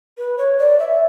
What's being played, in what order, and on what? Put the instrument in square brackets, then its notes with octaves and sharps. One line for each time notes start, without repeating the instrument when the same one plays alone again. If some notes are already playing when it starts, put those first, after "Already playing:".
[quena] B4
C#5
D5
E5